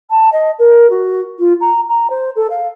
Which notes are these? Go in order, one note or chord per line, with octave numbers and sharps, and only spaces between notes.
A5
D#5
A#4
F#4
F4
A#5
A#5
C5
A4
F5